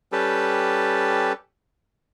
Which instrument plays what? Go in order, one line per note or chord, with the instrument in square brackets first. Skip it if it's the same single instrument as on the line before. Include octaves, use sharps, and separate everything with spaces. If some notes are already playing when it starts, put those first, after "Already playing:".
[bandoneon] G3 C#4 G4 A4 B4